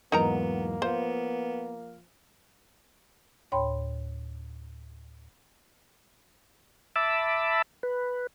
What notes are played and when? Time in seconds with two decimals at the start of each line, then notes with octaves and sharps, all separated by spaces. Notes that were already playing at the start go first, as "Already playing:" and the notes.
0.12 E2 G#2 F#3 A#3 B3 D#4 A#4 A#5
0.82 F3 B3 C5 F5
3.52 D2 A2 C#5 G5 B5 C6
6.96 E5 A5 B5 D6 E6
7.83 B4